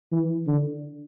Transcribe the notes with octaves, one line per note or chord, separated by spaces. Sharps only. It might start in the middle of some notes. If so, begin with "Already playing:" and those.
E3
D3